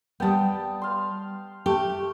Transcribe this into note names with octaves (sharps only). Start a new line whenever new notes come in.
G3 B3 G5 A5 D#6
F5 C6
A3 G4